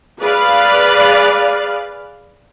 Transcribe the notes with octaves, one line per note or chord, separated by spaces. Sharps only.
G#4 B4 D5 F5